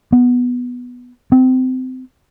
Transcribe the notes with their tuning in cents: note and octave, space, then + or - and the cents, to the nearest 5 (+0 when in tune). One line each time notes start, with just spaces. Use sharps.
B3 +0
C4 -25